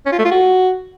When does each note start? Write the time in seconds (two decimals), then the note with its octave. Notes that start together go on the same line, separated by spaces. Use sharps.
0.06 C#4
0.12 F4
0.18 A3
0.25 F4
0.31 F#4